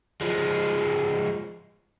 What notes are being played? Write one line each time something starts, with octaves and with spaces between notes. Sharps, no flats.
F3 G#3